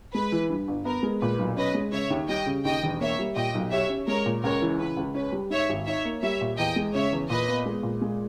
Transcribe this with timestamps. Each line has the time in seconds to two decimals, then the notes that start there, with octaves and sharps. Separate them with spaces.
0.14 G#3 B4
0.32 E3
0.49 G2
0.68 G1
0.85 B3 A#4
1.03 G#3
1.21 A#2 B4
1.39 B1
1.57 C#4 B4 D#5
1.74 G#3
1.92 C#3 C#5 E5
2.10 D#2
2.28 G3 D#5 G5
2.46 C#3
2.64 D#2 D#5 G5
2.83 E1
3.00 A#3 C#5 E5
3.19 G3
3.36 A#2 D#5 G5
3.55 B1
3.72 G4 C#5 E5
3.89 C#4
4.07 G#3 A#4 C#5
4.26 A#2
4.43 C#2 A#4 C#5
4.62 E3
4.79 C#3 B4
4.97 C#2
5.15 C#4 B4
5.32 G3
5.50 G#2 C#5 E5
5.69 G#1
5.86 D#4 C#5 E5
6.05 A#3
6.22 G3 C#5 E5
6.41 A#2
6.58 E2 D#5 G5
6.76 G#3
6.94 C#3 C#5 E5
7.12 E2
7.29 A#2 B4 D#5
7.48 B3
7.66 G#3
7.83 A#2
8.01 G#3